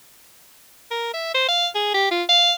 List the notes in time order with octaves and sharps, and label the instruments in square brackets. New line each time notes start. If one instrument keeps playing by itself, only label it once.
[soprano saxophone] A#4
E5
C5
F5
G#4
G4
F4
F5